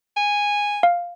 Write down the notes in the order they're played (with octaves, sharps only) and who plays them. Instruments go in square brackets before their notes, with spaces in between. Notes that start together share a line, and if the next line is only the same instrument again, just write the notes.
[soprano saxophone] G#5
[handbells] F5